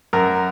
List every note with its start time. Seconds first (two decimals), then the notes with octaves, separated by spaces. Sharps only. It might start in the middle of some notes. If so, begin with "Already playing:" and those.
0.13 F#2 A#4